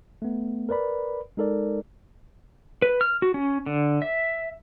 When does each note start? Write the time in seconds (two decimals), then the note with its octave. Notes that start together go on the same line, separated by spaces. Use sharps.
0.22 A3 B3
0.69 A#4 B4 D5 B5
1.37 G#3 D#4 A4 A#4 D5
2.82 B4
3.01 F6
3.22 F#4
3.34 C#4
3.66 D3
4.02 E5